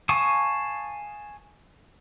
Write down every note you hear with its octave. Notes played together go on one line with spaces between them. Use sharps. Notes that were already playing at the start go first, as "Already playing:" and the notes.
F5 G#5 A5 C#6 D#6